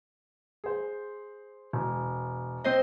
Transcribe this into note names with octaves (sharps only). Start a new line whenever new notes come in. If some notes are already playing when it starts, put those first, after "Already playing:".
G#4 C5
E1
C4 C5 D#5